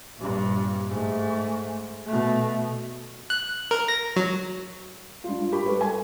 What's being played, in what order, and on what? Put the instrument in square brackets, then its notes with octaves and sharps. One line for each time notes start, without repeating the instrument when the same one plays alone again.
[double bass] A#1 G2
G#2 A3
B2 A3
[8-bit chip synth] F#6
A#4
A#6
F#3
[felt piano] G2 F4
G4 A#4 B5 C#6
G3 A4 B4
G#5